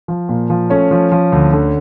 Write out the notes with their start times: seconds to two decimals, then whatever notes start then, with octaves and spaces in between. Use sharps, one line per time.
0.08 F3
0.29 A#2
0.50 F3
0.70 A3 C#4 C#5
0.91 F3
1.12 F3
1.32 D2
1.53 D3